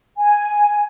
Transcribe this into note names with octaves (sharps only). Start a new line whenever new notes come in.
G#5